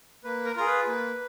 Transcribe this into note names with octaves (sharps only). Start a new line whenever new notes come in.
A#3 B4
A#4
F4 G#4 A#4
B4
A#3